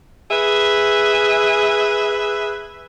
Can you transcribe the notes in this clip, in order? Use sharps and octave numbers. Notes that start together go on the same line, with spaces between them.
G#4 B4 E5